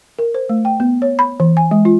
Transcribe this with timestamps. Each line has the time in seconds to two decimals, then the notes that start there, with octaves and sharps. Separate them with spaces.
0.19 A#4
0.34 C5
0.49 A3
0.65 G5
0.80 B3
1.02 C#5
1.19 B5
1.40 E3
1.57 G#5
1.71 G#3
1.85 F4